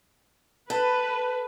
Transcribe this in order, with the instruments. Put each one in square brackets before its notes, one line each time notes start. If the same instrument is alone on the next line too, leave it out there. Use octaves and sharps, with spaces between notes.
[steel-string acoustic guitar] A4 [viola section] B4